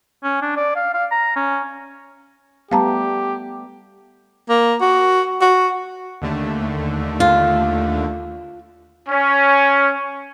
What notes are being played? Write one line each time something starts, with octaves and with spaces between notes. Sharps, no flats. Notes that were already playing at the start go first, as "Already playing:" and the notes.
C#4
D4
D5
F5
F5
A#5
C#4
G3 A3 B3 G4 F5 A5 A#5
A#3
F#4
F#4
D#2 D3 A3
F4
C#4